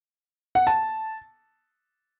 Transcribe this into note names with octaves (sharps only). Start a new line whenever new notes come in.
F#5
A5